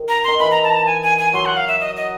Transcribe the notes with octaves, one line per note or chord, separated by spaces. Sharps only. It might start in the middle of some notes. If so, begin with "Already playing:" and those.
Already playing: D#3
A#5
D#3 C6
E3 B5
A#5
A5
A#5
A5
G#5
G#5
G#5
F#3 C6
F#5
F5
E5
D#5
D#5